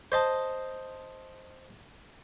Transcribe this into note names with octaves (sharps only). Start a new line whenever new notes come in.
C5 D#5 A5